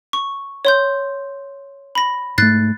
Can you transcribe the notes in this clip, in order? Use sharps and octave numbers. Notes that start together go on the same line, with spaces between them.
C#6
C#5 C6 G6
B5 A#6
G#2 A3 F#6 A6 C7